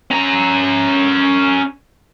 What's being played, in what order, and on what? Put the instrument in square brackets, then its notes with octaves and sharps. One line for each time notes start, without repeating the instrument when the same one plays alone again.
[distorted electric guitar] C#4 A#5